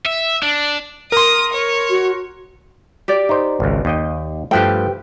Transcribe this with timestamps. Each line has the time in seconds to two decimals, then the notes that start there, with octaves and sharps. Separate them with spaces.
0.05 E5
0.43 D4
1.12 A#4 C6 D#6
1.53 C#5
1.90 F#4
3.08 G4 D5
3.29 D#4 C5
3.60 G#1 C#2
3.85 D#2 D#5 G5
4.51 G2 F3 A3 G4 B4 G5